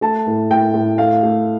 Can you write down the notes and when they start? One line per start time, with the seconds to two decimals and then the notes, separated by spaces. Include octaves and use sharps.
0.01 A3 A5
0.27 A2
0.51 A2 G5
0.74 A2
0.98 A3 F5
1.23 A3